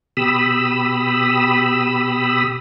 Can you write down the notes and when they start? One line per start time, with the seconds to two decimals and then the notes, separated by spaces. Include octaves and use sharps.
0.17 B2 G4 B5 D#6 E6